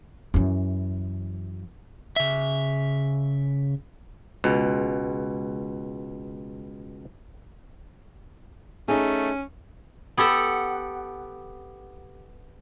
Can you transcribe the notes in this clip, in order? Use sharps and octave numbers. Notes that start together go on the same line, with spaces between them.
F#2 E3
C#3 E5
C#2 B2
A3 C#4 D#4 G#4
B3 G4 A4 F#5